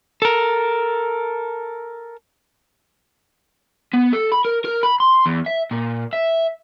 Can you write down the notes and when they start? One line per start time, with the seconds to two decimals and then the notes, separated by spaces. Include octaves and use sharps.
0.22 A4 A#4
3.94 B3
4.13 A4
4.32 B5
4.45 A#4
4.65 A#4
4.83 B5
5.00 C6
5.26 E2
5.46 E5
5.71 A#2
6.13 E5